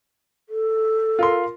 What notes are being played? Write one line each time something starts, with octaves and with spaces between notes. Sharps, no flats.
A4
F4 A#4 C6